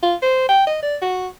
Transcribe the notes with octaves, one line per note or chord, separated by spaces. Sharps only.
F4
C5
G5
D#5
D5
F#4